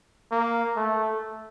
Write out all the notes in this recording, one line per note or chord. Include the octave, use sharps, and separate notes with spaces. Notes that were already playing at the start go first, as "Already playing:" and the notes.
A#3
A3